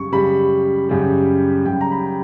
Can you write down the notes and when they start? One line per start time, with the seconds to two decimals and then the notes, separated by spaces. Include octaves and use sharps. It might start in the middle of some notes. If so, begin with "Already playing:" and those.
Already playing: F#2 C#3 G3 C#6
0.12 F#2 C#3 G3 B5
0.89 F#2 C#3 G3
1.65 F#2 C#3 G3 G5
1.81 A#5
1.92 B5